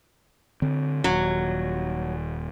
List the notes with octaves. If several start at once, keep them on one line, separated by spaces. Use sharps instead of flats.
D3 C4
D#1 F#3